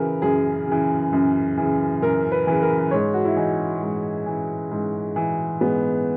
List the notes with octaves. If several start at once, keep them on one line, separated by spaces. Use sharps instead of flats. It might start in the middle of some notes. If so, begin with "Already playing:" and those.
Already playing: C#3 E3 A#4 B4
F#2 G#4
C#3 E3
F#2
C#3 E3
F#2 A#4
B4
C#3 E3
A#4
G#2 C#5
F#4
E4
E3 D#4
G#2
E3
G#2
E3
G#2 B3